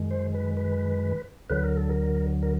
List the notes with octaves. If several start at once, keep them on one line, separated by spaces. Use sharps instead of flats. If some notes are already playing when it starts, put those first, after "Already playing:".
Already playing: F#2 D#3 G#3
C5
B4
B4
D2 D3 F#3 B4
A#4
A4
A#4
A#4